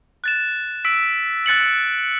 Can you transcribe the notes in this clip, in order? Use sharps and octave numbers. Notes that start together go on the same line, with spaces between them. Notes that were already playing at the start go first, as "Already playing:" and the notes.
F#6 A6 E7
E6 B6 D7
F#6 A6 C#7 F#7